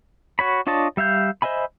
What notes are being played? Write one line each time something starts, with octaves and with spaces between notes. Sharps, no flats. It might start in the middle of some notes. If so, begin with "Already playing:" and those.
F#4 C#5 B5
D4 F4 C#5 D#5 A5
G3 E5 F5 G6
C5 D#5 E5 G#5 B5